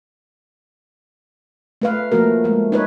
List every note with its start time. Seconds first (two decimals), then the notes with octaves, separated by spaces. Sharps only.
1.82 A3 B4 F5
2.12 F3 A3 A#3 F#4 A#4
2.44 F3 G#3 A3
2.72 D#4 B4 C#5